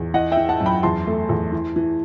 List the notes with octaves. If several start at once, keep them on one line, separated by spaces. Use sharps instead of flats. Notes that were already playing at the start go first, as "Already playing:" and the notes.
Already playing: E2
E3 D#5 F#5
E5 G5
E3
F#5 A5
F#2
G5 B5
E2 A5 C6
A3
E2
E3
E3